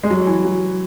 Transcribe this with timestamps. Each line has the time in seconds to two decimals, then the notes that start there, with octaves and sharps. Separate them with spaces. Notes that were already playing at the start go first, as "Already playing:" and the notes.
0.03 G#3
0.10 F#3
0.27 E3
0.45 F#3